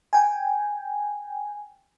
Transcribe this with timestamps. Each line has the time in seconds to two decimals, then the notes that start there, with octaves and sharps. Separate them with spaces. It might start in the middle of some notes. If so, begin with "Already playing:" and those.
0.13 G5 G#5